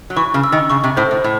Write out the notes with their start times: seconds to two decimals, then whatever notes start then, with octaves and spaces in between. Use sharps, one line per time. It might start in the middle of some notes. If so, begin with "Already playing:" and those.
0.10 F#3
0.16 E3 C#6
0.34 C#3
0.44 E6
0.52 D#3
0.70 C#3 C#6
0.84 C3
0.97 A2 C5
1.11 A2
1.24 A2